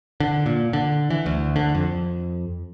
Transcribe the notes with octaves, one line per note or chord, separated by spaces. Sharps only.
D3
A#2
D3
E3
D2
D3
F2